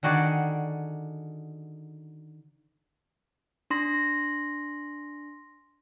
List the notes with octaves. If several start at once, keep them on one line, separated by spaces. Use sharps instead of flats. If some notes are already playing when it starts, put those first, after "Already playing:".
D3 D#3 F#4 G#4 D5 G5
D4 C6 A#6